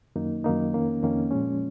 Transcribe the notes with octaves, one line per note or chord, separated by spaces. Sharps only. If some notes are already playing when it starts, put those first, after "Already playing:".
F#2 D#3 A#3 D#4
F#2 D#3 A#3 D#4
F2 D#3 A#3 C#4
F2 D#3 A#3 C#4
A#2 F3 G#3 C#4